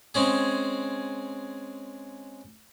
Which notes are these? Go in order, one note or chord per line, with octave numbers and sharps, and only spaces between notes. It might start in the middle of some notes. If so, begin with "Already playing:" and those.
G#3 C4 C#4 G#4